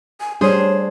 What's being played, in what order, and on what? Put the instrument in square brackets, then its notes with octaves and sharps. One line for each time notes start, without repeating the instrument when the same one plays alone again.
[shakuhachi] G#5
[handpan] G3 A3 D4 [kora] G#4 C5 [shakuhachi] C#5